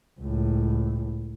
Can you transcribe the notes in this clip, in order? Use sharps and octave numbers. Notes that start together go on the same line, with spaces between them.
C#2 A2